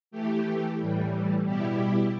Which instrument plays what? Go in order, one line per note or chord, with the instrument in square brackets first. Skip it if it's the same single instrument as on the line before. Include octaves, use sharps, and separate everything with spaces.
[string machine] E3 A3 G4
A2 E3 G3
B2 G3 E4 G4